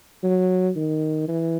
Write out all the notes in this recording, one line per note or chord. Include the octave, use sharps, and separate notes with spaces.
F#3
D#3
E3